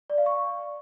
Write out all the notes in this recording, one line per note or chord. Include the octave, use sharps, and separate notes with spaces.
D5
F5
C#6